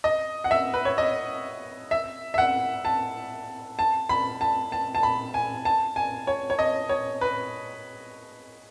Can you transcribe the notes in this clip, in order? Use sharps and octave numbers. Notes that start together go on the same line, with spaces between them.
D#5
F#5
E5
B4
C#5
D#5
E5
E5
F#5
A5
A5
B5
A5
A5
A5
B5
G#5
A5
G#5
C#5
C#5
D#5
C#5
B4